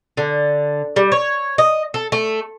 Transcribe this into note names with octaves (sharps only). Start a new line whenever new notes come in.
D3
G3
C#5
D#5
A4
A3